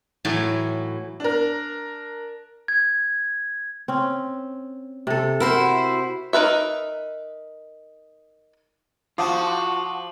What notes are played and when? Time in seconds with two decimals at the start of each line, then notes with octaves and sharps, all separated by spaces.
0.25 A2 E3 F#3 G#5 A5
1.20 D4 A#4
2.68 G#6
3.88 C4 C#4
5.07 C3 A4
5.40 E4 F#4 A#4 C5
6.33 D#4 A#4 B4 E5
9.18 F3 F4 F#4 F#5 A5 D6 D#6